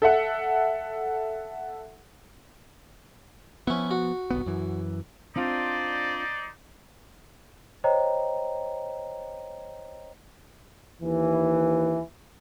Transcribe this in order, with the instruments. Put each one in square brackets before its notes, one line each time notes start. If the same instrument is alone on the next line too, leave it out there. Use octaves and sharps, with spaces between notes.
[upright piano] A4 E5 F#5
[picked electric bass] F3 B3 [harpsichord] C#4 E4
[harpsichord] F#4
[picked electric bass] G1 C2 B3
F#2 E3
[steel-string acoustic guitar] C4 D4 F4 [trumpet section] D#4 C5 D5
[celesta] C5 C#5 D#5 G5 A#5
[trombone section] D#2 E3